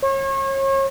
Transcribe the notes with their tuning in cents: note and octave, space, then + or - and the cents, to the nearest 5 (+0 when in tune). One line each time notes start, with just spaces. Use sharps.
C#5 -35